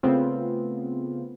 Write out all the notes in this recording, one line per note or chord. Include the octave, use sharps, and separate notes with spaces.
C#3 A3 B3 C4 F4